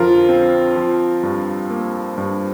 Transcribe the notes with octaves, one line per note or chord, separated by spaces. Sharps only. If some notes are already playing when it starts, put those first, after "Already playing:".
Already playing: F2 D3 F3 F4 A#4
C4
F3
G2
A#3
G2